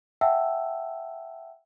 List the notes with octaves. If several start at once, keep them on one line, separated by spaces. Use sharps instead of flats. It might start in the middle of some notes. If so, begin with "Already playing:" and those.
E5 F#5 G5 A5 E6